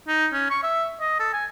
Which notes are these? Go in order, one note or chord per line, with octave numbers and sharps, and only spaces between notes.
D#4
C#4
C#6
E5
D#5
A4
G#5